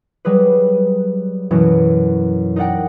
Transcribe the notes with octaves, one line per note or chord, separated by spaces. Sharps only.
F#3 G3 G#4 B4
F#2 B2 E3 F#3 C#4 E4
D#4 A#4 D5 F#5 G5